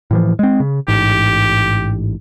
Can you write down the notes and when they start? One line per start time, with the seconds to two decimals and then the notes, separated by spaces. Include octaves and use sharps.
0.11 A2 E3 F3
0.39 G#3 C4
0.60 C#3
0.88 A1 G#2 G4